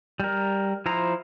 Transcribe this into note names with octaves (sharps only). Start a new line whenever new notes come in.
G3 A#4
F3 E4 C5 A#5